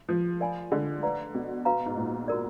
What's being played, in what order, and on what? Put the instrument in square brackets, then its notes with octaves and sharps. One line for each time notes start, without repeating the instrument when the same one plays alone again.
[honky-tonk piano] F3
[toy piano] A#4 D5 F5 G#5 B5
[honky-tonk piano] D3
[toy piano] B4 D5 F5 A#5
[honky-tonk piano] B2
[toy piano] F#4 B4 F5 A#5
[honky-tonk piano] G#2
A#2
[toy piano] F#4 A#4 D5